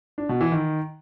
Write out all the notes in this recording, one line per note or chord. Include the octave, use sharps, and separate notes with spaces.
D4
B2
E3
D#3